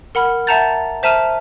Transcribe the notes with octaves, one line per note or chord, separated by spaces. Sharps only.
A#4 F#5 B5 F6
E5 F#5 A5 A#5 G6 A6
C5 E5 A5 A#5 F6 D#7